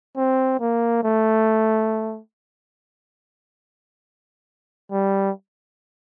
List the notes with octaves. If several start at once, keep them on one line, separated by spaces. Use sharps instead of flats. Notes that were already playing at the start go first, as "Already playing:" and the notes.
C4
A#3
A3
G3